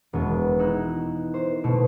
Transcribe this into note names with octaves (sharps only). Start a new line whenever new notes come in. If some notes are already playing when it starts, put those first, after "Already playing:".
E1 B3
D#4 E4 E6 F#6
C5
B2 A3